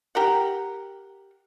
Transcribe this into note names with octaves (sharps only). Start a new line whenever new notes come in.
G4 A#4 F#5